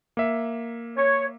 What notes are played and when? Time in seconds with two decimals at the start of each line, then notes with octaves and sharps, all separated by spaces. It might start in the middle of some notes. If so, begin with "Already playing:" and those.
0.17 A#3 E5
0.96 C#5